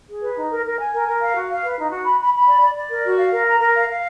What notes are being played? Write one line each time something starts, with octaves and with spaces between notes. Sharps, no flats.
G#4
B4
D#4
A#4
A#4
G#5
A#4
A#4
F5
F#4
F5
B4
D#4
F#4
B5
B5
B5
D5
D5
D5
A#4
F#4
F5
A#4
A#5
A#4
F5
F5